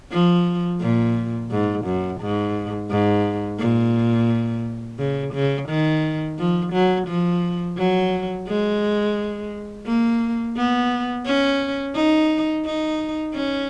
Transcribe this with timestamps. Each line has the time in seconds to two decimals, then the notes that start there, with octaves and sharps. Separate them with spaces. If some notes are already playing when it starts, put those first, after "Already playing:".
0.11 F3
0.81 A#2
1.51 G#2
1.85 F#2
2.21 G#2
2.90 G#2
3.59 A#2
4.99 C#3
5.34 C#3
5.69 D#3
6.38 F3
6.73 F#3
7.08 F3
7.77 F#3
8.48 G#3
9.86 A#3
10.56 B3
11.25 C#4
11.95 D#4
12.65 D#4
13.34 C#4